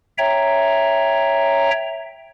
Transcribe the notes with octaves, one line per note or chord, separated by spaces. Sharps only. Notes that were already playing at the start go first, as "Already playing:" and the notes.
C#5 E5 G5 A#5